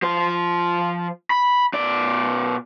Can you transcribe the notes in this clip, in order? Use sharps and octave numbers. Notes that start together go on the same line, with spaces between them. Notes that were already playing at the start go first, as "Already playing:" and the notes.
F3 C5
B5
B2 D5